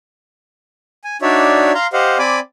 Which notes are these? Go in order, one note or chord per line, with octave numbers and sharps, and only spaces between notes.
G#5
D4 D#4 F#4 C#5 D5 E5
F5 A#5 C6
G4 C5 D#5 F5 F#5
C4 D5 G#5 B5 D6